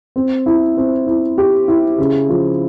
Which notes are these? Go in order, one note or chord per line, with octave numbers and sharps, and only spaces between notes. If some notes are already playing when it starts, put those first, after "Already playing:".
C4
E4
C4
E4
G4
E4
C#3
F3